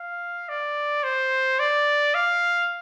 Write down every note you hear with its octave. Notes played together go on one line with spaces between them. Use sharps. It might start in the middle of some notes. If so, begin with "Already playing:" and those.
Already playing: F5
D5
C5
D5
F5